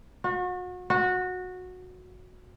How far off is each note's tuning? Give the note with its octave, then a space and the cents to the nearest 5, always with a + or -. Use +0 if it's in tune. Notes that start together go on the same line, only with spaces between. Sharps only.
F#4 -35
F#4 -15